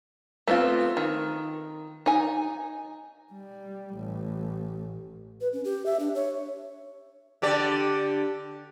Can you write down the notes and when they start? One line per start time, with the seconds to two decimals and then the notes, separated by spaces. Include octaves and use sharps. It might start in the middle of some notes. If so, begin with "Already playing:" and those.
0.48 A3 B3 C4 F4
0.97 D#3
2.06 D#4 G#5
3.32 G3
3.95 A1
5.41 B4
5.53 C#4
5.64 G4
5.86 E5
6.00 D4
6.15 C#5
7.42 D3 G4 D5